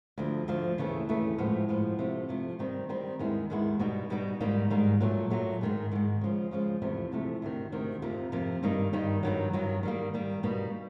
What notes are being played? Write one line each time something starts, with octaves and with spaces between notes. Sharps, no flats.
D2 D3 F3
D2 D3 F3
D#2 C#3 E3 A3
D#2 C#3 E3 A3
A2 F3 G#3 B3
A2 F3 G#3 B3
C3 F3 A3
C3 F3 A3
D#3 G3 C4 D#4
D#3 G3 C4 D#4
D#2 D#3 G#3 B3 E4
D#2 D#3 G#3 B3 E4
B2 G3 B3 D#4
B2 G3 B3 D#4
G#2 D#3 G3 A#3 D#4
G#2 D#3 G3 A#3 D#4
A#2 F#3 A3
A#2 F#3 A3
G#2 D#3 G#3
G#2 D#3 G#3
C#3 F3 G#3
C#3 F3 G#3
E2 C3 F3 A3
E2 C3 F3 A3
D2 C3 D#3
D2 C3 D#3
F2 C3 F3 A#3
F2 C3 F3 A#3
G2 D#3 G3 A#3 D#4
G2 D#3 G3 A#3 D#4
G2 D#3 F#3
G2 D#3 F#3
D#3 G3 A#3
D#3 G3 A#3
B2 G3 A#3 D#4